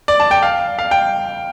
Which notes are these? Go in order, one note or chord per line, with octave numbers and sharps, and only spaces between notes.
D5
A5
G5
F5
F5
G5